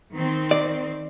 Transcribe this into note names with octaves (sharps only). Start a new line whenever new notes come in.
D#3 C4
D5